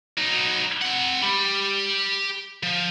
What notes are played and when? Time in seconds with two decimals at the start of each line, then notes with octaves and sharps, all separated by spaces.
0.17 F#3 D#4
0.82 C4 F#5
1.22 G4 B5
2.63 F3